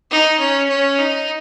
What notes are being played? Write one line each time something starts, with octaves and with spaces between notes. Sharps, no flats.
D#4
C#4
C#4
D#4